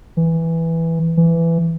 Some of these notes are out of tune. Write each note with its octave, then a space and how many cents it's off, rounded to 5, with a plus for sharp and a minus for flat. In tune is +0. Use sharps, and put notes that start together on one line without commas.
E3 +0
E3 +15